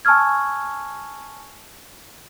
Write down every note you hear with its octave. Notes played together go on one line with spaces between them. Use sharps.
G#5 A5 C#6 E6 F6 G#6